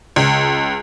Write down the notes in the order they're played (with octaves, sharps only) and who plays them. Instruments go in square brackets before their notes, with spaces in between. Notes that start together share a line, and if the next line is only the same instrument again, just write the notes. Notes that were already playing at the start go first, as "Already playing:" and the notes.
[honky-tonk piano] C#2